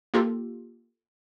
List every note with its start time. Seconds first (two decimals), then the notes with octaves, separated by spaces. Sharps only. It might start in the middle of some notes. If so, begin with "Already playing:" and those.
0.14 A#3 F4 G4 A4